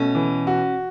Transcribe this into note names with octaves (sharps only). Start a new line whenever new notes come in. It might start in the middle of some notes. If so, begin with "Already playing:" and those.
Already playing: B2 A3 C#4
E3
F#4